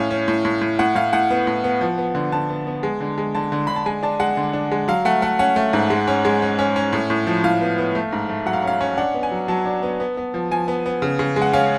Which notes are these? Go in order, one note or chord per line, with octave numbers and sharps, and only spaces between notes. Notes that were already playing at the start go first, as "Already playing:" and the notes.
Already playing: A2 C#4 F5
C#4
A2
A2
A2
A2 F#5
A2 F5
A2 F#5
B3
A2
B3
F3
B3
D3
D3 A5
B3
B3
G#3
D3
G#3
D3 A5
D3
D3 B5
A5
G#3 G#5
D4 A5
G#3 F#5
D3
D4
G#3
F#3 F5
A3 F#5
A3 F#5
C#4 F#5
A3
G#2
G#3
C#4
G#3
C#4
C#4
C#4
A2
A2
F3
A2 F5
B3
B3
A3
G#2
A3
F#3 F#5
F5
C#4 F5
C#4
D4 F#5
B3
G#5
F#3
F#3 A5
D4
B3
B3
B3
F3
F3 G#5
B3
B3
C#3
C#3
G#3
F#5
C#4 F5